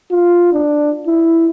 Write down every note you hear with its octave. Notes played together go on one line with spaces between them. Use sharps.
F4
D4
E4